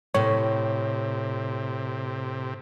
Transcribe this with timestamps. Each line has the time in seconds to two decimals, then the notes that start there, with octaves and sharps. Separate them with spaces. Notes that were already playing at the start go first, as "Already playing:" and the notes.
0.14 A2 C3 C#5